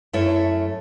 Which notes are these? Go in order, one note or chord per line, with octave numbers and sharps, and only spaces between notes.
F#2 A3 E4 A4 C#5